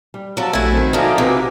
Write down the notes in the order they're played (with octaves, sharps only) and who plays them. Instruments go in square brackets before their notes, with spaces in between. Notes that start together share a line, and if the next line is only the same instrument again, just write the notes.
[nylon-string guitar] G3
[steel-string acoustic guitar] F3 F#3 [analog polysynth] A5 E6
[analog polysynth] A#1 G#6 [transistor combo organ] A3 G#5 [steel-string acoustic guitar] E4 F#4
[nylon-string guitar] D#3 C4
[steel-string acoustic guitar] D3 F3 [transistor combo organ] D#4 A#4 [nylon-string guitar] F#4 [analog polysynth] E5 G#5 D6
[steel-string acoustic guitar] C3 [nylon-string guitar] F4 F#4 B4